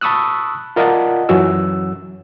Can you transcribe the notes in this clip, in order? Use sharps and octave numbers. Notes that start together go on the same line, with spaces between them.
A5 B5 C#6 D#6 E6 F#6
F4 A#4 D5 D#5 F#5 A5
F#2 E3 F#3 C#4 F#4 E6